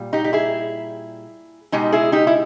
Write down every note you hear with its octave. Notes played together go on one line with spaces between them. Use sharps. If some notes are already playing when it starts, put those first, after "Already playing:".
Already playing: A#2 G3
D#4 G4
G4
E4 G#4
B2 G#3 D#4 G4
E4 G#4
D#4 G4
E4